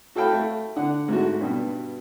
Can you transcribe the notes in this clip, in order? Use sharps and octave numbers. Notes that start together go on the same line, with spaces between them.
F#4 A4 F5 G5 B5
A3
D3 F#5
G#2 A3 F#4
G2 B2